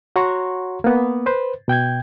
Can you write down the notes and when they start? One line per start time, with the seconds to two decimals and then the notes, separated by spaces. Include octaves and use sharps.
0.16 F#4 C#5 F#5 A#5 C6 C#6
0.84 A#3 B3
1.26 B4 C5
1.68 B2 G5 G6 G#6